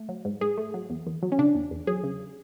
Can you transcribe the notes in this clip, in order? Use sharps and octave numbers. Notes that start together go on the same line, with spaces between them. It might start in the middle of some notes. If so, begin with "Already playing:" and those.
Already playing: A3
F#3
G#2
G#2 G#4
A3
F#3
E2
E2
F#3
C#4
C#3 D4
E2
E2
F#3 G#4
C#3